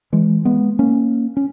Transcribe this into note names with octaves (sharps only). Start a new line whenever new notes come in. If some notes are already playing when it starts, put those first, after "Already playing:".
E3 G#3
G#3 B3
A#3 C#4
C#4